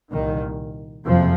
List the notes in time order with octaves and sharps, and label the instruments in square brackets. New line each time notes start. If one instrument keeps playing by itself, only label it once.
[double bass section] C2 A#2 D#3
F#1 F2 C3 F3